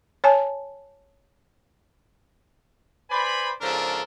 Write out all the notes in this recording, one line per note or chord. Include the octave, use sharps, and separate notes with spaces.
C#5 G#5 A5
B4 C5 D5 G#5 B5
G#2 C#3 F3 D4 A4 A#4